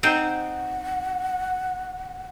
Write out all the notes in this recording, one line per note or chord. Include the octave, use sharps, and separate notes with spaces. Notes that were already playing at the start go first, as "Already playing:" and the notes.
C4 D#4 C5 F#5